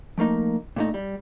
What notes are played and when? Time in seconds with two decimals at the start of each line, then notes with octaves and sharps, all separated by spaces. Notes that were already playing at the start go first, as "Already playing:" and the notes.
0.18 F3 A3 A#3 D#4
0.76 A#2 A3 D#4
0.94 G3